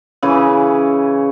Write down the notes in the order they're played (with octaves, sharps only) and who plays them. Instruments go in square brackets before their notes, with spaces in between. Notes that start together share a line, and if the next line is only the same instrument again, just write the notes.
[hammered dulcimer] C#3 E3 E4